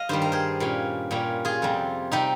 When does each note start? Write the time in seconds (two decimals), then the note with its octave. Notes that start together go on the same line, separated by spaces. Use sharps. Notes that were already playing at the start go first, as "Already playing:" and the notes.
Already playing: D#5 F5
0.09 G2 D#3 G3 C5
0.22 A#4
0.32 G#4 C5
0.60 A#2 G3 C#4
1.11 A#2 G3 C#4
1.45 F4 G#4
1.62 F2 C3 G3
2.12 C3 G3 D#4 G4